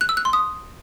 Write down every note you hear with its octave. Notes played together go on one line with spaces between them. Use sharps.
F#6
E6
F#6
C6
D#6